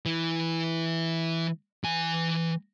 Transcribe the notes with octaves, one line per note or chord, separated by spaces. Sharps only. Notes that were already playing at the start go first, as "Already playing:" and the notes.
E3
E3 G#5